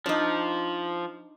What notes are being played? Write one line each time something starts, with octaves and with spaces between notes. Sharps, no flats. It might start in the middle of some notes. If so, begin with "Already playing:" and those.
F3 D4 D#4